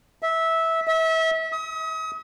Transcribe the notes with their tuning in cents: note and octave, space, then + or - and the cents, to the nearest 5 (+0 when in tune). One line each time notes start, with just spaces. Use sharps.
E5 -15
E5 -30
D#6 +35